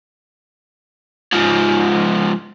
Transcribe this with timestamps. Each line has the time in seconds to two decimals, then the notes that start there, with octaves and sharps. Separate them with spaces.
1.33 G#2 F3